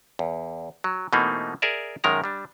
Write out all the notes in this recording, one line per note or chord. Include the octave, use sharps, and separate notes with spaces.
E2
F#3
B2 E3 A3 A#3 C4 D#4
G#4 A#4 D5 E5
F#2 D#3 G#3 A#4 A#5
G3 D4